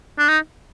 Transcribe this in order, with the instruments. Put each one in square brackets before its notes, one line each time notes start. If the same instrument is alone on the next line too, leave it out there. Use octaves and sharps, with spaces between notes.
[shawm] D4
D#4